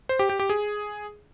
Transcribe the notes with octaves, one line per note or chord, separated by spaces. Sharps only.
C5
G4
G4
G4
G#4